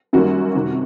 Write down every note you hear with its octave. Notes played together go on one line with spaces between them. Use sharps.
F#2 D#3 G3 A#3 F#4
F2 C3 D#3